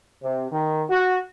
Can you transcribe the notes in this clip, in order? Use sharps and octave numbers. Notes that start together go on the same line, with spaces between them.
C3
D#3
F#4